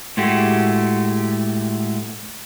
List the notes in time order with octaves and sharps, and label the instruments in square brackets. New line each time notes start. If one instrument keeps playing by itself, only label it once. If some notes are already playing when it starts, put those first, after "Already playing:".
[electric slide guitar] A2 G#3 A3 F#4 G4